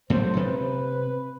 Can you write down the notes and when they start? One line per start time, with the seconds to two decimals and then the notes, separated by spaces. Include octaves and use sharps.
0.10 A2 F#3 G3 C5
0.36 C3 B4